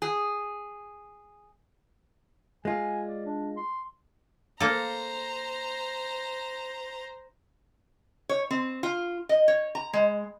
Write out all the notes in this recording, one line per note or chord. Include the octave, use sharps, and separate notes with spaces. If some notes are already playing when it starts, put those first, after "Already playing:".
G#4
G#3 F4 G#5
D5
D4
C6
A#3 A4 C5 A#5
C#5
C4
F4
D#5
C#5
A#5
G#3